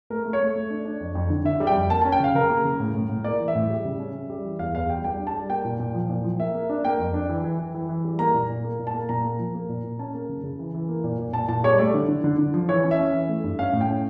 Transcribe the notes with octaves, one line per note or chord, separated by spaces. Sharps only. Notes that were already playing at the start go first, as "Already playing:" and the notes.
A3 A#4
A3
C#5
A3
A3
D4
D4
F2
F2
D3
D3 E5
G3
G5
F2
A#3 A5
C#4 A5
G5
C#3 F5
C#3 A#4
A#3
C#3
A2
A2
A2
A#3 D5
E3
E5
A2
G3
C#3
C#4
G3
G3
E3
E2 F5
E2 F5
G3 G5
G3 G5
D4
A5
G3
A#3 G5
A#2
A#2
F3
A#2
F3
A#3 E5
A#3
D4
A#3 G5
F2
D4
E3
E3
E3
E3
E3
G3
A#3 A#5
A#2
A#2
A#3
A#2
A5
A#3
A#2 A#5
A#3
F3
A#3
A#2
A#2
C#4 A5
A#3
C#3
C#3
E3
E3
A#3
A#2
A#2
A#2 A5
A#2 A5
G3 C#5
A3 D5
D3
D3
D3
D3
F3
E3 C#5
C#4
E5
C#4
E3
A3
G2
C#4 F5
A2
G5
C#4